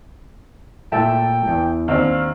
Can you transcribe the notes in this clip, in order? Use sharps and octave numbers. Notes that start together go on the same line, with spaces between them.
A#2 A3 E5 G5 A5
E2
D#2 C4 D4 F5